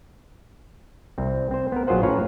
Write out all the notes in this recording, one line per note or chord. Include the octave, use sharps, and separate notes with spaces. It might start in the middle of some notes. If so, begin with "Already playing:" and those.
C2 C4
C4 C5
B3 A#4
A#1 F#3 F4 G#4 C5 F#5
A2 C#4 B4 C#5 F5 A#5